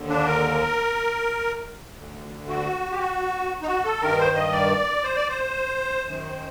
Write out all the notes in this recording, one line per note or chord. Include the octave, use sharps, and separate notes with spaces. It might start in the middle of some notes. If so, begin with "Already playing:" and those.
Already playing: D#2 D3
D4
A#4
D2 D3
F#4
G4
F#4
D#4
F#4
A4
G2 D#3 A#4
C5
D#5
D5
C5
D5
C5
F#2 D#3